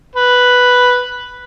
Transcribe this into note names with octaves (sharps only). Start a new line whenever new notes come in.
B4